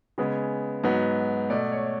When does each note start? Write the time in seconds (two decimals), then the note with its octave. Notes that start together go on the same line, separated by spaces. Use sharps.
0.18 C#3 G#3 B3
0.84 G#2 F#3 B3
1.50 B2 A3 D5
1.72 C#5